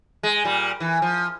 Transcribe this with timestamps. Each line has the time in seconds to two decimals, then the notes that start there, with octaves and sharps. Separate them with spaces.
0.23 G#3
0.44 A#2 G3
0.80 E3
1.02 F3